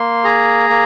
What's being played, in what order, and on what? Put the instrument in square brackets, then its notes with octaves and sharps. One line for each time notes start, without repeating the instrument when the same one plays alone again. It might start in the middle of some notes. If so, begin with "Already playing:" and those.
Already playing: [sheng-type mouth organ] A#3 C6
G#4 A#5
A#3